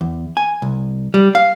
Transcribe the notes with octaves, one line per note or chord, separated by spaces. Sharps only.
E2
G#5
C2
G3
F5